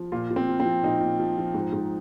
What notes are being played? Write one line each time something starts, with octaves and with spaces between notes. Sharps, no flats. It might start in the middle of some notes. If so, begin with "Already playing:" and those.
Already playing: F3
A#2 F4
A#2
C4
F3
C4
F3
A#2 D#4
A#2
F3
F3
G#2
G#2